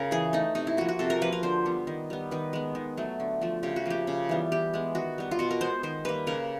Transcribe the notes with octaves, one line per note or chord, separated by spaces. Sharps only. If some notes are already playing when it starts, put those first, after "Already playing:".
Already playing: C#3 A#4
E3 G#4
A3 D#4
C3 D#4
E4
F3 A#3 F#4
F#4
C3 A4
A#4
F3 A#3 B4
A#4
D3 C5
G3 B3
D#3
G3 B3
D#3 B4
G#3 B3
D#3
F#3 A3
D3
F3 A3
C#3 G4
F#4
F3 A#3 G4
C#3
E3 G3 B3
E3 G4
G#3 B3
D#3 F#4
G3 B3
F4
B2 F#4
A#4
G#3 B3 C5
D#3 C5
G3 A#3 B4
C#3 A#4